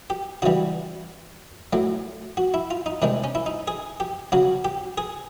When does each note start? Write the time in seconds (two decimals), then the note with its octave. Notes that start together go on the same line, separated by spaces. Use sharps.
0.10 G4
0.42 C#3 E3 G3 F#4
1.73 A2 F#3
2.37 F#4
2.54 E4
2.71 F4
2.86 D#4
3.02 C3 D#3 G#3 D4
3.24 C#4
3.35 E4
3.46 D#4
3.68 G#4
4.00 G4
4.32 C#3 F#3 F#4
4.65 G4
4.98 G#4